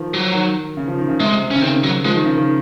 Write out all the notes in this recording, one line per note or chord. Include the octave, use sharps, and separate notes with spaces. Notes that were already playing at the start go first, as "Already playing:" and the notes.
Already playing: D#3 F3
F#3
D#3
C#3
F3
D#3
C#3
C3 G#3
C#3 C#4
D#3 C4
F#3
F3 G#3
D#3
C#3
D#3